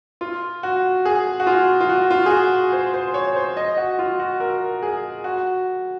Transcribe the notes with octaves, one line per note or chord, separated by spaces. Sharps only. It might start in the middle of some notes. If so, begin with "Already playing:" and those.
F4
F#4
G#4
F#4
F4
F4
F#4
F4
G#4
F#4
C5
C5
C#5
C5
D#5
F#4
F4
F#4
A#4
G#4
F#4